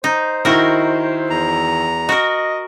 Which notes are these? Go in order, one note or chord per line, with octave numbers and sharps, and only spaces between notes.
D#4 C5
D#3 E4 F#4 A#4
E2 A#5
F#4 A#4 D#5